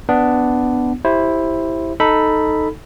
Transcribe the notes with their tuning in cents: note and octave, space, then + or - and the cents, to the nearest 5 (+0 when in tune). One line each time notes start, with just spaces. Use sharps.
B3 +10 D4 +0
E4 +0 G4 +0 C5 +15
D#4 +0 A4 +0 B5 +0